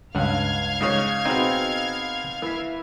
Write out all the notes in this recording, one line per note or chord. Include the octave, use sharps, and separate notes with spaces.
C#2 G2 F5 F#5 F6 G#6
G#2 C#3 C#5
B2 C4 D#4 G#4
E3 E5